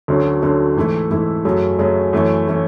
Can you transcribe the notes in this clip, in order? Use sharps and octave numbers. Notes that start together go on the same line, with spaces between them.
D2 D3 F#3 C#4
D2 D3 F#3 C#4
G#2 E3 A3 E4
G#2 E3 A3 E4
F#2 C#3 F#3 A3
F#2 C#3 F#3 A3
F#2 E3 A3 C#4
E3 A3 C#4